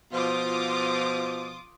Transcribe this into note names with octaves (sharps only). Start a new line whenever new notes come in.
B2 F3 F4 D6 D#6